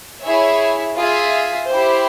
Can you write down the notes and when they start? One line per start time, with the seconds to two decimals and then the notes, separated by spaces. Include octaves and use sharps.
0.22 E4 G#4 C#5 E5
0.97 F4 G#4 E5
1.70 E4 G4 C5